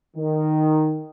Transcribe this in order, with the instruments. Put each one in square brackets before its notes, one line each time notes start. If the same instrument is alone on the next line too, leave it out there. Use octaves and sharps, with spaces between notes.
[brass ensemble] D#3